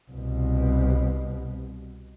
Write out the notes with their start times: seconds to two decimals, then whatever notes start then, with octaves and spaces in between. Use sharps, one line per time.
0.11 C2 B2